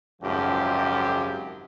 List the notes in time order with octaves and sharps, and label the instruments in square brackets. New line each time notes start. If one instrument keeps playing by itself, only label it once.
[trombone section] G#1 C#2 F#2 F3 G4